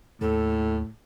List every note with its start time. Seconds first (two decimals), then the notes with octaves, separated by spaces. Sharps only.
0.21 D#2 A2 A4